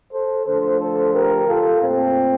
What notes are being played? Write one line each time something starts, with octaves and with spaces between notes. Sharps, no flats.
A4 C5
D3 F3 A3 A4 C5
A4 C5
G4 A#4
F4 A4
A#2 A3 C4